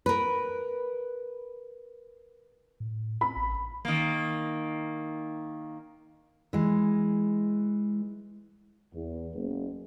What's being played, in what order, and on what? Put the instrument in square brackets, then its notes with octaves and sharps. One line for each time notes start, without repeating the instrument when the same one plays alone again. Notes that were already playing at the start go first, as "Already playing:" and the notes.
[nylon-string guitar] A#4 B4
[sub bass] A2
[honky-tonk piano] B5
[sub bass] A1
[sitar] D#3 A#3
[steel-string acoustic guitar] E3 G#3
[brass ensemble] E2
F#1